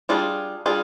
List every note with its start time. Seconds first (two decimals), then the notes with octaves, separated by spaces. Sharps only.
0.09 G3 D4 F4 G#4
0.66 G3 D4 F4 G#4